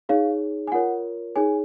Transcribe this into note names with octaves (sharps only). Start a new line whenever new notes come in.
D#4 G#4 C#5 F5
G#5
F4 A#4 C#5 F#5
D#4 G#4 C#5 G#5